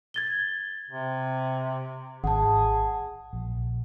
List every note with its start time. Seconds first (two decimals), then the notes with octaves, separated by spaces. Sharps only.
0.14 G#6 A6 G7
0.90 C3
2.24 G#1 G#4 F#5 A5
3.33 A#1